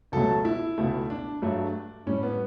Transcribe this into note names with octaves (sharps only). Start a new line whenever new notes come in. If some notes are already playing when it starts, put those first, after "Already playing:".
C#2 B2 F#3 A3 A4
E4
C#2 B2 A3
D4
G2 F#3 A3
A2 G3 C#4
B3